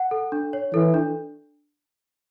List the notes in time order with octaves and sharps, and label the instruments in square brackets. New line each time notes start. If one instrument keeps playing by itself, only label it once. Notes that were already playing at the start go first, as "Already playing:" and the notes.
Already playing: [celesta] F#5
A4
D4
C#5
[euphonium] E3 [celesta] A4
[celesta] D4